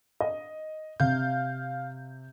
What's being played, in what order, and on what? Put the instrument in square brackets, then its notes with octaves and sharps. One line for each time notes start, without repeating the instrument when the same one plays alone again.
[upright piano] D#5
[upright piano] C3 [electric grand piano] F5 G6